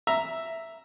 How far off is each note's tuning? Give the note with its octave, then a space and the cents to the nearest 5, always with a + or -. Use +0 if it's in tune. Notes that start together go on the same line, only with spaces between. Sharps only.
E5 +0 A#5 +0